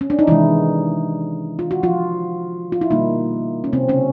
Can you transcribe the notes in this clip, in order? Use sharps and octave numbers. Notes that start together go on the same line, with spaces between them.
C#4
D4
D#4
C3 D#3 E3 G#3 E4
F4
F#4
F3 F4
F4
E4
B2 D#3 G3 A#3 D#4
C#4
C3 C4
C#3 C#4